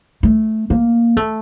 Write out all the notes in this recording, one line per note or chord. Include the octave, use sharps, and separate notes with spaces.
A3
A#3
A3